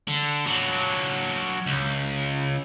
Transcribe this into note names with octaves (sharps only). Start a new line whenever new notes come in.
D3
F#3 D4
C#2